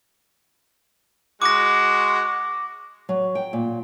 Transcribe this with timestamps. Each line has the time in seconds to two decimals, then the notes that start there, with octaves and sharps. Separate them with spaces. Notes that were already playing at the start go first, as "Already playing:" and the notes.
1.42 G#3 F#4 D6 A#6
3.09 F#3
3.35 G5
3.53 A#2